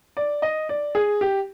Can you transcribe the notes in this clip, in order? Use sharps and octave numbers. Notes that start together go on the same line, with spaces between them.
D5
D#5
D5
G#4
G4